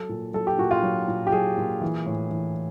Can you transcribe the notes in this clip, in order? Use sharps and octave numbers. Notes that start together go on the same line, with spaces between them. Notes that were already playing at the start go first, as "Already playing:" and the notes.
Already playing: F#3 A4
A#2
F#3 A4
G4
A#2 F#4
F4
F#3
A#2
G4
F#3 G#4
A#2
E3
A2
E3